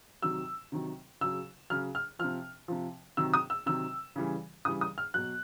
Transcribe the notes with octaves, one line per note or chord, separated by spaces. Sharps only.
C3 D#3 F#3 E6
C3 D#3 F#3
C#3 F#3 E6
C#3 F#3 F6
F6
C3 F3 F6
C3 F3
C3 D#3 F#3 E6
D#6
E6
C3 D#3 F#3 E6
C#3 E3 G3
C#3 E3 G3 D#6
D#6
F6
B2 F#3 F#6